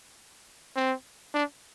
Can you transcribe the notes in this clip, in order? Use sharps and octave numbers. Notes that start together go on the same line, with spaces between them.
C4
D4